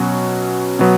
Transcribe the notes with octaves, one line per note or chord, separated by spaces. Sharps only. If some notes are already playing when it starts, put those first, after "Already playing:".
Already playing: B2 F#3 C#4 F#4
B2 F#3 B3